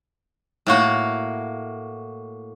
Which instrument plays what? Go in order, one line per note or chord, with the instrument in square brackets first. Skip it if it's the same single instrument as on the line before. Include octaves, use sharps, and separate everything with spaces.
[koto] A2 A#3 F#4